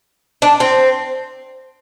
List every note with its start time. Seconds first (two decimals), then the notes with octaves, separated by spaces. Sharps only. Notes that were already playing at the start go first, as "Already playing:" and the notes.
0.42 D4
0.60 C4